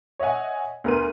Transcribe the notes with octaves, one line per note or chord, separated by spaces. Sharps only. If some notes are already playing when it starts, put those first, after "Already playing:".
C#5 D#5 E5 F#5 G#5
D2 B3 A#4 C6 D#7